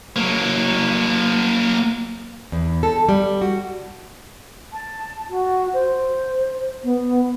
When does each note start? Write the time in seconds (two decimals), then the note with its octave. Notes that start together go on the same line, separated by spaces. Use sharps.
0.16 F#3 A#3
2.52 E2
2.83 A4
3.09 G3
3.41 F#4
4.72 A5
5.29 F#4
5.73 C5
6.83 B3